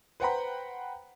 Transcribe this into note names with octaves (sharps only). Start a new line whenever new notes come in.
B4 C5 F#5 G5 A#5 B5